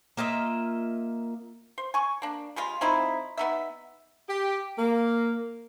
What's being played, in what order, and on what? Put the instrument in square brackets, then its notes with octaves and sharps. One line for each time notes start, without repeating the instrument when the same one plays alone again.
[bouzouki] A#3 F4 D#5 E5
[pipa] C5
G#5 C#6
A#3 D4
G3 G#3 F4
F3 C4 D#4 E4
B3 D#4 E5
[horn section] G4
A#3